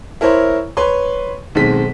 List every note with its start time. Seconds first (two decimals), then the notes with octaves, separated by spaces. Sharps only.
0.21 E4 A#4 C5 C#5
0.77 B4 C#5 C6
1.55 B1 D#3 G#3 C4 B6